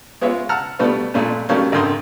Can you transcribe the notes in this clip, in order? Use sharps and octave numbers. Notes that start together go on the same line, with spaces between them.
G#3 B3 F4 C#5 E5
F#5 A5 A#5 E6 F6
B2 G3 A3 B3
F2 A#2 G#3 A3
D#3 F#3 G3 A3 A#3 C#4
G#1 F#2 D3 D#3 C6 D#6